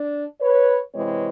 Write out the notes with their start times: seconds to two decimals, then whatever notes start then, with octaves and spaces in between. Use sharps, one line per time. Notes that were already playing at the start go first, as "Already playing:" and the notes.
Already playing: D4
0.41 B4 C#5
0.94 C3 E3 G#3 C4 B4 C#5